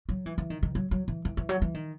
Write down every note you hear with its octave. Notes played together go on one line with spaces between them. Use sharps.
F#3
E3
E3
D#3
D#3
F#3
F#3
E3
E3
E3
F#3
E3
D#3